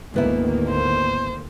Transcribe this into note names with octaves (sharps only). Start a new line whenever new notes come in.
D2 G#2 D#3 A#3 B3 E4
C5